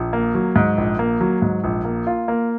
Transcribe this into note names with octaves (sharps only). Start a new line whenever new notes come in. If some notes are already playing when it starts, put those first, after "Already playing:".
Already playing: A#1
A#3
F#3
G#2
A#1
A#3
F#3
G#2
A#1
A#3
F4
A#3